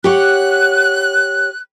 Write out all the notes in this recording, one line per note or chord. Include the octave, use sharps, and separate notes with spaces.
G4 C#5 F#5 F#6